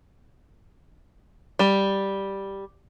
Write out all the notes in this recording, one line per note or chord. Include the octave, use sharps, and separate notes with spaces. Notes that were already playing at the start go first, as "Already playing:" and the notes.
G3